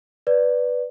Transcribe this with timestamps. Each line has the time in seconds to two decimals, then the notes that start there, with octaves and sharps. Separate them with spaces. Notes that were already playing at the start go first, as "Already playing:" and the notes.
0.27 B4 D5